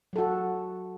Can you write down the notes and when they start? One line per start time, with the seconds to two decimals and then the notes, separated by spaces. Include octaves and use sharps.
0.13 F#3
0.16 A4
0.18 F#4